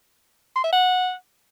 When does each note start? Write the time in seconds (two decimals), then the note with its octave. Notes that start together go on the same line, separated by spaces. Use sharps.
0.56 C6
0.64 E5
0.73 F#5